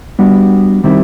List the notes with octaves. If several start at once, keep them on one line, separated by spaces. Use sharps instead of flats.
G3 B3 D4 F#4
D#3 G3 C4 E4